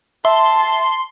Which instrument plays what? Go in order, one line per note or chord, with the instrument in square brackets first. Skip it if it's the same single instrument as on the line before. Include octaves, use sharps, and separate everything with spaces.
[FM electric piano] E5 [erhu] A5 [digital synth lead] C6